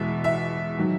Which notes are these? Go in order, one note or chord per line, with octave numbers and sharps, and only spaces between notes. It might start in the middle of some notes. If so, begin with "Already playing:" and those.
Already playing: E2 B2 G#3 E5
E5
D#3 F#3